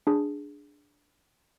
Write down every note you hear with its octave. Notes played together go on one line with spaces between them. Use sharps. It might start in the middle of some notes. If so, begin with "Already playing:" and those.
D4 G#4